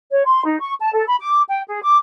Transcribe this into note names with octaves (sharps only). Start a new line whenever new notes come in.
C#5
C6
D#4
C#6
A5
A4
B5
D6
G5
G#4
D6